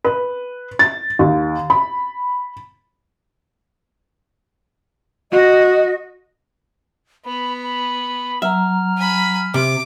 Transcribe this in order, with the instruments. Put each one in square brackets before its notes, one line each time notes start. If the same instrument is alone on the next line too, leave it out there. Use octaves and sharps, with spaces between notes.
[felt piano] B4
A6
D#2
B5
[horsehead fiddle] F#4 [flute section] D#5
[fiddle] B3 [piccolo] B5
[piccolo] B5
[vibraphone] F#3 A#5 [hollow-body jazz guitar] E5 [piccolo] F6
[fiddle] G#5 B5
[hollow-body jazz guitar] C3 [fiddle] D6